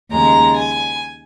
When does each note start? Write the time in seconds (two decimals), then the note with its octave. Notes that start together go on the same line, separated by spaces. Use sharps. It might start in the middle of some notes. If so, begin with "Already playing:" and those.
0.11 D#2 C#3 G#3 A#5
0.57 G#5